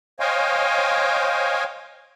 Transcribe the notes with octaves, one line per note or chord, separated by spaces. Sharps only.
C5 C#5 D#5 F5 G5 G#5